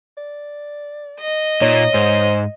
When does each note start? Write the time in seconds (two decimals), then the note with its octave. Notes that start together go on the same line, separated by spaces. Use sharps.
0.17 D5
1.21 D#5
1.62 A#2 D#4 C#5
1.94 G#2 C5